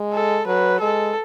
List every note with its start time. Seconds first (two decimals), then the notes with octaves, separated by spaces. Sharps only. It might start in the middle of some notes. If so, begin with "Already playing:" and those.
Already playing: G#3
0.14 A4
0.47 F#3 B4
0.80 G#3 A4